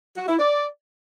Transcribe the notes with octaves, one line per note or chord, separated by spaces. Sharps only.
F#4
E4
D5